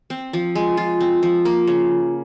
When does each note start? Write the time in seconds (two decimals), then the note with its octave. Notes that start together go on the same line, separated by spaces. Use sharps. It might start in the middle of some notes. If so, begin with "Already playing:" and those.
0.10 C4
0.33 F3
0.55 G#3
0.77 F4
1.00 C4
1.23 F3
1.45 A#3
1.67 C#3